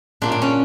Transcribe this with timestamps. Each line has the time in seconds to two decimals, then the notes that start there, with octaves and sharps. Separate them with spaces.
0.22 A#2 A#3 C#4 D4
0.32 D4
0.42 C#4